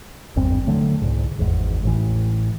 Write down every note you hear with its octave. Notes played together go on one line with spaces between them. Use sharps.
G#1 E2 G2 C4
D3 F#3 A3
C2 G#2
G#1 E2 G#2
A1 A2 E3